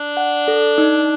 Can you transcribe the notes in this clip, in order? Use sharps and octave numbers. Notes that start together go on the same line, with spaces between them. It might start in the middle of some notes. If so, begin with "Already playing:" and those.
Already playing: D4
F#5
A4
D#4